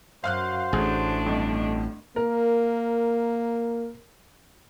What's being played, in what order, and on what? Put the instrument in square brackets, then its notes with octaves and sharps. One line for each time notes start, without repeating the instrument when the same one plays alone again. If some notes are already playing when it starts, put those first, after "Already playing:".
[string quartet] F#2 [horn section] F#4 C5 [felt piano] F5 F6 F#6
[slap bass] A1 [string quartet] A3 D4 [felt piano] G#4
[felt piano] G1 F2
[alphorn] A#3 [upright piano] A#4